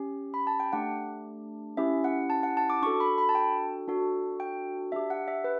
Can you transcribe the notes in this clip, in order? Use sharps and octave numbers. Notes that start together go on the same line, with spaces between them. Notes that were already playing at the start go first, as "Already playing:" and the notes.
Already playing: C#4 G4
B5
A5
G5
A3 D4 G4 F#5
C#4 E4 G4 E5
F#5
A5
F#5
A5
D6
D4 F#4 A4 C#6
B5
B5
A5
G5
D4 F#4 A4
G5
D4 G4 E5
F#5
E5
B4